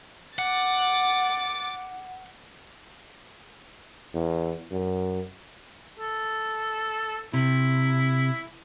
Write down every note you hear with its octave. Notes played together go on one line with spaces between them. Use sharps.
F#5 D6 A6
E2
F#2
A4
C3 E4